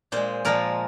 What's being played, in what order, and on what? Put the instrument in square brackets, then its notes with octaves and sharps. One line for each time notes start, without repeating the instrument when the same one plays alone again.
[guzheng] A#2 G#3 C5
A#2 F3 G#3 A#4